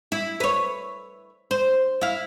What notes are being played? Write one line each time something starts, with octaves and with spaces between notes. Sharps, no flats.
E4
B4 C#5
C5
E4 F5